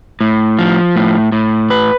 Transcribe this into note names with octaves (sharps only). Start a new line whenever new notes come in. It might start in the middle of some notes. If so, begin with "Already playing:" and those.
A2
F3
A2
A2
B4